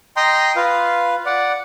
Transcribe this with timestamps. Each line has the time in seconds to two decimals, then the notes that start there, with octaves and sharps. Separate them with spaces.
0.17 D#5 G5 A#5 C6
0.56 F4 B4 F5
1.26 D5 F#5